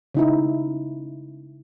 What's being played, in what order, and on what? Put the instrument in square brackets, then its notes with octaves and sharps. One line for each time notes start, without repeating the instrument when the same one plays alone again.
[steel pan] C#3 D#4 E4